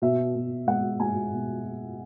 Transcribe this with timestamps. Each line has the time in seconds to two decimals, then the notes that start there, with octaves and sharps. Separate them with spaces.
0.02 B2 E5
0.35 B2
0.67 G#3 F#5
0.99 G#3 G#5
1.33 B2